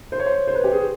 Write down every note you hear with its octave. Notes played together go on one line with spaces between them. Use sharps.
C5
C#5
C5
C5
B4
G4
G#4